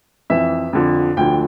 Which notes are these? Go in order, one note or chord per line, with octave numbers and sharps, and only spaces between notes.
F2 E3 E5
F2 D3 F3
D2 D3 F3 G5